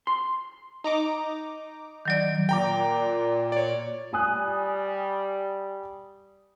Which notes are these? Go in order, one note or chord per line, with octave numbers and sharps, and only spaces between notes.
C6
D#4 A#5 D6
D#3 F#3 D5
A#2 G5 A#5 D6
C#5 D5
G3 G#5 D#6 F#6